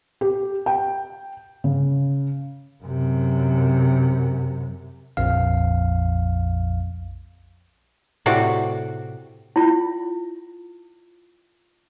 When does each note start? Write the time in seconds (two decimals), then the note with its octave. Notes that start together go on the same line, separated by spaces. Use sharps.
0.21 G4
0.66 G5
1.64 C#3
2.83 F#2 C3
5.17 A#1 F2 F5
8.26 A2 C3 F#4 D5 F#5
9.56 E4 F4